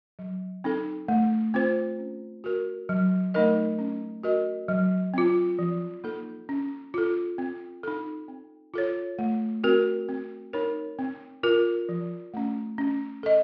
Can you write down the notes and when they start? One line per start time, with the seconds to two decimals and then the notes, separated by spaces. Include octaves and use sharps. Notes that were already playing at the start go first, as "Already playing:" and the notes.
0.19 F#3
0.64 C4 D#4 A4
1.08 A3
1.54 C4 F4 C5
1.99 C#4
2.44 F#4 A#4
2.89 F#3
3.34 A3 D#4 A#4 D#5
3.79 C#4
4.23 F#4 A#4 D#5
4.68 F#3
5.14 C4 F4
5.59 F3
6.04 A#3 D#4 A4
6.49 C#4
6.94 F4 A4
7.38 C4
7.83 D#4 A4
8.28 C4
8.74 F4 A4 C#5
9.19 A3
9.64 C4 F#4 A#4
10.08 C4
10.53 D#4 A#4 C#5
10.99 C4
11.43 F4 A#4
11.89 F3
12.34 A3 C#4
12.78 C#4
13.23 A4 D#5